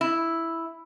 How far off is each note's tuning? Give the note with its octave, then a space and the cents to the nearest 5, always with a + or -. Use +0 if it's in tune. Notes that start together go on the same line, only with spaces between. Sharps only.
E4 +0